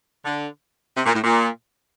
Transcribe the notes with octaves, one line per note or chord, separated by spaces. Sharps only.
D3
C3
A#2
A2
A#2